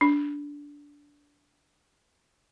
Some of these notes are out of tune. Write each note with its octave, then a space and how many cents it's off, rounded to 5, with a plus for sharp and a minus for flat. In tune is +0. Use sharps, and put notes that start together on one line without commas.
D4 -15